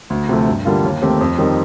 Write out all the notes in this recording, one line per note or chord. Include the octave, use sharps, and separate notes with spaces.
D2
C3 F3 A3
G2
D3 G3 A#3 F4
D#2
D#3 A3 C4 G4
F2
D#3 G3 C4 D#4